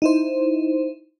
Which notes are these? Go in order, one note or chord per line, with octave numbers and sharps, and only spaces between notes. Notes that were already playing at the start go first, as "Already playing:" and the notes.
D#4 E4 C5